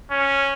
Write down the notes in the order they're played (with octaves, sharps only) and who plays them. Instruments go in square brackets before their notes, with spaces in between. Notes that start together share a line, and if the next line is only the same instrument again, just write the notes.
[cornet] C#4